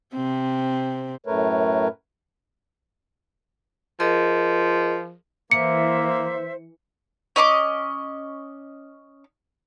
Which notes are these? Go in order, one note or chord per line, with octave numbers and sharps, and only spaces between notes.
C3 C4
F#2 A2 A3 A#4 B4 C#5
F3 G#4 A#4 D#5
E3 A#3 C5 E5 C#7
C#4 D#5 C6 D6